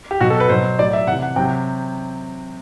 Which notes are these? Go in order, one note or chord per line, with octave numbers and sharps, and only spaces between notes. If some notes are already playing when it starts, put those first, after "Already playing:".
G4
B2 F#3 F#4
A4
B4
B2 F#3 C5
A2 F#3 D5
E5
C3 E3 F#5
F#5
C3 F#3 G5